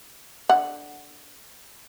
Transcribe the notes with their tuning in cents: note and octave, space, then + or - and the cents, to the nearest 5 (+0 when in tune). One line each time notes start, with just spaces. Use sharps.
D3 +0 F#5 +0